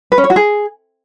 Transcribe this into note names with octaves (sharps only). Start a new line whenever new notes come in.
B4
C#4
C#5
F#4
G#4